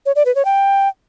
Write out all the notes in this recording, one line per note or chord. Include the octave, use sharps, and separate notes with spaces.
C#5
D5
B4
C#5
G5